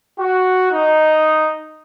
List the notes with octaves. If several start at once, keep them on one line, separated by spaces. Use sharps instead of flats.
F#4
D#4